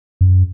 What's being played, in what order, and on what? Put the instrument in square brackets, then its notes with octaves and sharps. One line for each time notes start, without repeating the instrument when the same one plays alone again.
[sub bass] F#2